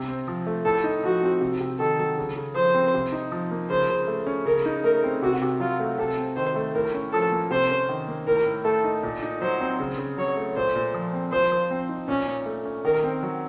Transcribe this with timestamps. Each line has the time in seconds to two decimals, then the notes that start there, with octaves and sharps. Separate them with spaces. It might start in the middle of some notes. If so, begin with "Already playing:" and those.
Already playing: C3
0.08 C4
0.28 F3
0.47 A3
0.65 A2 A4
0.84 D#4
1.03 F3 F#4
1.23 C4
1.41 C3
1.61 C3
1.79 D#3 A4
1.99 F#3
2.18 C#3
2.37 C#3
2.55 F3 C5
2.75 C4
2.94 C3
3.12 D#4
3.32 F3
3.51 A#3
3.70 C#3 C5
3.90 C#3
4.08 A3
4.27 C#4
4.46 C#3 A#4
4.66 D#4
4.84 A3 A#4
5.04 C4
5.22 C3 F#4
5.41 C3
5.60 F#3 F4
5.80 A3
5.98 C3 A4
6.17 C4
6.36 D#3 C5
6.56 A3
6.74 A2 A#4
6.94 C#4
7.13 F3 A4
7.32 A#3
7.51 C3 C5
7.70 C#4
7.89 D#3
8.08 A#3
8.27 A2 A#4
8.46 A2
8.65 A3 A4
8.84 D#4
9.03 A#2
9.23 D#4
9.42 F#3 C5
9.60 C4
9.80 C#3
9.98 C#3
10.17 F#3 C#5
10.37 A3
10.56 A#2 C5
10.75 A#2
10.94 F3
11.13 C4
11.32 F3 C5
11.52 F3
11.71 C4
11.89 D#4
12.08 A#2 C#4
12.27 A#2
12.46 A3
12.65 C#4
12.85 D#3 A#4
13.04 C4
13.23 F#3